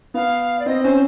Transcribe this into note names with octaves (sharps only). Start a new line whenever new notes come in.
B3 F5
D5
C4 D#5
C#4 C5